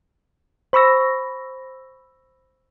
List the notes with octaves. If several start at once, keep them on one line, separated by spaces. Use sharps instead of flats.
C5 B5 C#6 E6 A#6